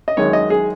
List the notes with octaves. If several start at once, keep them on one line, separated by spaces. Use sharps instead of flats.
D#5
F#2 D#3 G#3 C#5
D#5
G#4